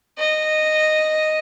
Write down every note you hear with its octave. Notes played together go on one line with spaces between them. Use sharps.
D#5